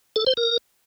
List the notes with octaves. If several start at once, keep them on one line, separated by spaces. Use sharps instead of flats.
A4
C5
A#4